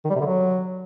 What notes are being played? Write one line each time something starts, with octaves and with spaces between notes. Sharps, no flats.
D#3
G3
C3
D3
F#3